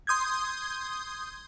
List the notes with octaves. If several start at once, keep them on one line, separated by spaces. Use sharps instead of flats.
C6 D#6 G6 G#6